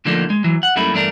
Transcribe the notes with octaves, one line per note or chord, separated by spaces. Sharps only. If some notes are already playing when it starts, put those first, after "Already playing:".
D3 F3 A3 A#3 D4 D#4
G#3
E3 F#3
F#5
F#2 G3 A3 A#3 D#4 E4
E2 G2 A3 D4 A#4